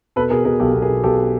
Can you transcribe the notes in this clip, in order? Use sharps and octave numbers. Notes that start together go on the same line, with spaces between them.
B2 A4 B4
B2 G#4 A#4
B2 G#4 A#4
B1 G4 A4
B1
G#4 A#4
B2
B1 G4 A4